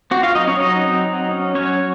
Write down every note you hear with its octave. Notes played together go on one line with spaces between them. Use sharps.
C4 F#4
F4 F5
F#3 D#4 D#5
C#4 C#5
F#3 D#4 D#5
C4
F#3
C#4
F#3 C#4 C#5
C#4